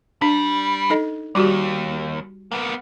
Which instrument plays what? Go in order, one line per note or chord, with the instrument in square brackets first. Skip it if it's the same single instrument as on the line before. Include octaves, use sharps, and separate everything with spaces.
[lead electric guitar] G3 [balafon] D4
[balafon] D#4 A4 D#5
[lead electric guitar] D#2 [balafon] G3 F#4 G4
[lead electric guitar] A#3 B3